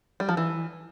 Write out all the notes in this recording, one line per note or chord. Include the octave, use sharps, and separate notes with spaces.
G3
F3
E3